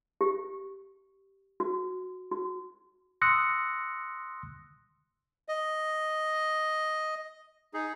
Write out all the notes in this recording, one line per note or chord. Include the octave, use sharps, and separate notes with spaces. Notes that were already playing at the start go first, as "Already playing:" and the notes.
G4
F#4
F#4
C6 D#6 E6 F#6 A#6 C#7
D#5
D#4 G#4